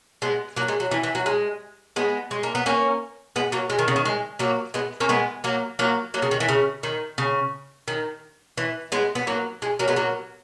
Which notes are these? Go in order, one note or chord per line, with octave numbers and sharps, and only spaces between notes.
G#3 B3
F#3 A#3
G#3
F#3
E3
E3
F#3
G#3
G#3 B3
G#3
A#3
B3
A#3 C#4
G#3 B3
F#3 A#3
G#3
D#3
C#3
D#3
G#3
F#3 A#3
G#3 B3
A#3 C#4
G#3 B3
F#3 A#3
F#3 A#3
F#3 A#3
C#3
D#3
E3
C#3
D#3
C#3
D#3
E3
G#3 B3
B3
F#3 A#3
G#3
F#3 A#3
G#3 B3
F#3 A#3